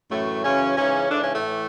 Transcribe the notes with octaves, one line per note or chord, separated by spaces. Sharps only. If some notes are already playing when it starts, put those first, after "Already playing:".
F#2 A2 E3 A3
F#2 C#3 E3 C#4
G#2 C#3 E3 C#4
G#2 D3 E3 D4
C#3 C#4
A2 A3
E3